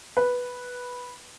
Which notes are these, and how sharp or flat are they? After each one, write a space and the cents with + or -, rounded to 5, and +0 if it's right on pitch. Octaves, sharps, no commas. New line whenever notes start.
B4 -5